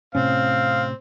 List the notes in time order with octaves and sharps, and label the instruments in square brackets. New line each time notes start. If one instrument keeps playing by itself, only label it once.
[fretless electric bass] A2 C3 C#4 [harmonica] C4 [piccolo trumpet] F5